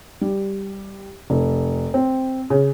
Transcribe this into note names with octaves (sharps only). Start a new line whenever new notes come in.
G3
F1
C4
C#3